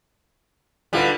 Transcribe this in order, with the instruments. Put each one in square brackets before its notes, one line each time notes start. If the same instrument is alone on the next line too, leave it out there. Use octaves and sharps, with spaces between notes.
[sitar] D3 G3 [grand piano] E4 F4 B4